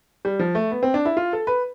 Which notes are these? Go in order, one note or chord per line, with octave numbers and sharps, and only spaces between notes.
G3
F3
A3
B3
C4
D4
E4
F4
A4
B4